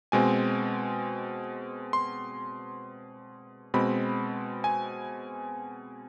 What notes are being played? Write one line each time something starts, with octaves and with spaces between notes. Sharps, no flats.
B2 G#3 C4 G#5
C6
B2 G#3 C4 B5
G#5